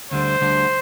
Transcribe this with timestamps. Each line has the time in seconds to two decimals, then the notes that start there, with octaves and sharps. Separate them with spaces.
0.11 D2 D3 G3 C5
0.41 D2 D3 G3